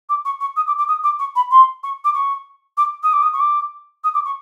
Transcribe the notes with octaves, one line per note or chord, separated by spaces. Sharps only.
D6
C#6
C#6
D#6
D6
D6
D#6
D6
C#6
B5
C6
C#6
D6
C#6
D6
D#6
D6
D#6
C#6
D6
D#6
D6
C#6